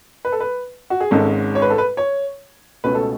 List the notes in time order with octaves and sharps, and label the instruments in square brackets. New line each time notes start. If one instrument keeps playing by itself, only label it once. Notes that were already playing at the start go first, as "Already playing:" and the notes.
[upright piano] B4
A4
B4
F#4
G#4
G#1 G#2 G#3 C#4 A4
C#5
B4
A4
B4
C#5
C#2 B2 A3 C#4 B4
A4